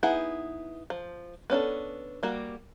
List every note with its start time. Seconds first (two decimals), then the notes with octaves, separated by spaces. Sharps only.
0.03 B3 D#4 E4 G#4 F#5
0.90 F3
1.50 B3 C#4 D4 A4
2.23 G3 A#3 F#4